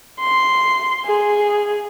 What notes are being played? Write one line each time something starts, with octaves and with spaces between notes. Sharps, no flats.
C6
G#4